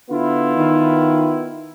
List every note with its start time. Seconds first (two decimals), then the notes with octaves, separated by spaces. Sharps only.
0.10 D3 B3 E4 F4
0.56 D#3